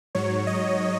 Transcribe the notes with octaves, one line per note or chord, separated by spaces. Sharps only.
G#2 F#3 C#5
D#5